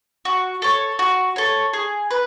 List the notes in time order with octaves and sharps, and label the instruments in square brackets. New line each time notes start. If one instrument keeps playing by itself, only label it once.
[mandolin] F#4
A4 C#5
F#4
A4 C#5
G#4
B4